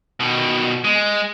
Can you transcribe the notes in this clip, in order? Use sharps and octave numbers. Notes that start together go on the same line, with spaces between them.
B2 D#3
G#3